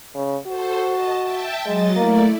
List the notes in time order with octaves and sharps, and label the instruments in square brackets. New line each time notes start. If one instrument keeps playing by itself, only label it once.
[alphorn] C#3
[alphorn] F#4 [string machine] A4 C5
[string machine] D#5 A5
E5 G5 A5
[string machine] F#3 D#5 A6 [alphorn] G#3
[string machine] A3 E4 D5 [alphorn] A#3